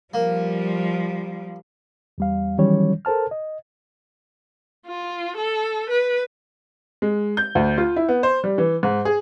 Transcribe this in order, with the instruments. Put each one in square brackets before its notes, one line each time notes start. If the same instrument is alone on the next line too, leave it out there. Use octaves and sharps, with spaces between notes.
[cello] F3 G3 [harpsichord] A#3
[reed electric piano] E2 G3 F5
D#3 E3 F#3 G3 C#4 C#5
A4 A#4 C5 A5 F6
D#5
[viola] F4
A4
B4
[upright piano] G#3
G6
D2
F4
E4
B3
C5
G3
E3
G#2
G#4